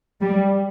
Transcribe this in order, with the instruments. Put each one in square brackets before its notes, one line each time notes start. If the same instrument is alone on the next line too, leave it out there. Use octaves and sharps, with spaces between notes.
[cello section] G3